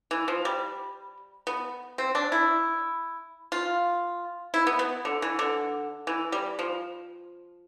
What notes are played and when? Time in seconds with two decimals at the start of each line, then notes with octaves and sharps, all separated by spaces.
0.11 E3
0.28 F3
0.45 G3
1.47 B3
1.98 C4
2.15 D4
2.32 E4
3.52 F4
4.54 E4
4.67 B3
4.79 B3
5.05 D3
5.22 E3
5.39 D3
6.07 E3
6.32 G3
6.59 F3